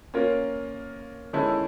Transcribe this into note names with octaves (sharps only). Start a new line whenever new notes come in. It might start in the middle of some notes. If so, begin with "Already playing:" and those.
A#3 C#4 F4 A#4
D#3 G#3 C#4 E4 A4